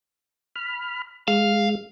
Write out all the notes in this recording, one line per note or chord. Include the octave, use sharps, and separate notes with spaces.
B5 F6
G#3 F5